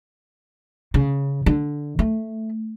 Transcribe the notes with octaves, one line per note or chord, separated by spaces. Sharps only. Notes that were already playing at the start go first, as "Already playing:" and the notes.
C#3
D3
A3